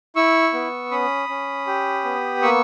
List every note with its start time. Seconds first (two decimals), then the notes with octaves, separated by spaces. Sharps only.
0.16 E4 C#6 E6
0.53 B3
0.91 C#4 B5 D#6
1.29 C#4
1.67 G4
2.04 B3
2.42 A#3 C#6 E6